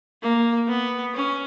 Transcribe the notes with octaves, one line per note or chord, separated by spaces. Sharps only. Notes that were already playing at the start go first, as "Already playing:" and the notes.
A#3
B3
C#4